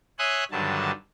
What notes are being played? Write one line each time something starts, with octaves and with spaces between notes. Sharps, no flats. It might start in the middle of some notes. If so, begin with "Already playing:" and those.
C#5 E5 G#5 C6 D#6 F#6
G2 D3 D#3 F#3 A5